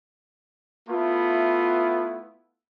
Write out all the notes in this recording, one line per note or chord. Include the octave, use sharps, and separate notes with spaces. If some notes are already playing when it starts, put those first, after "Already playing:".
A3 B3 E4 F4